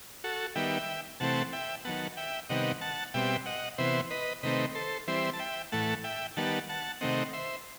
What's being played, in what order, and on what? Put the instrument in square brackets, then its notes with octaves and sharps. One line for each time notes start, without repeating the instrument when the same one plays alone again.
[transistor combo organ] F#4 A4
D#3 G3 B3 E5 G5
C3 E3 A3 C4 F#5 A5
E5 G5
D#3 F#3 B3 F#5 A5
E5 G5
C3 D#3 G3 B3 D#5 F#5
F#5 A5
B2 G3 C4 E5 G5
D#5 F#5
C3 E3 B3 C5 E5
B4 D#5
C3 D#3 A3 C4 B4 D#5
A4 C5
E3 G3 C4 C5 E5
A5
E5 G5
A2 E3 A3 F#5 A5
E5 G5
D#3 G3 B3 F#5 A5
F#5 A5
C3 D#3 A3 C4 D#5 F#5
C5 E5